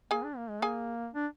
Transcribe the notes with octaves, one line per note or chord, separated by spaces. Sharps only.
A#3 G#4 G#5
D4
A#3
G#3
A#3 G#4 G#5
D4